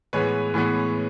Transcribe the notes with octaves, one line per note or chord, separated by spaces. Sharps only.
A2 E3 G#3 B3 B4 C#5
A2 E3 G#3 B3